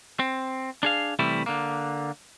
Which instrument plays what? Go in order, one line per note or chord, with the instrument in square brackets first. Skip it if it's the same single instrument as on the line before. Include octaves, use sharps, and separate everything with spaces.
[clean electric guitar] C4
D4 G#4 F5
C3 E3 G3 A3 E4
D3 A#3